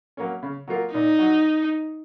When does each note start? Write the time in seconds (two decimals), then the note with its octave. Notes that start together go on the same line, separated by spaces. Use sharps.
0.17 F#3 A#3 C#4
0.43 C#3
0.68 F#3 A#3 F4 A#4
0.93 A#2 D#4
1.19 F#3